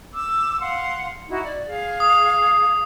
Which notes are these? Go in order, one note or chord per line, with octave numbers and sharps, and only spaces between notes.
D6 E6
F5 F#5 C6
D#4 E4 F#4
D5
G#4 F5
D#6